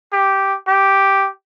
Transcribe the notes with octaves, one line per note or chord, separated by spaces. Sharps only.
G4
G4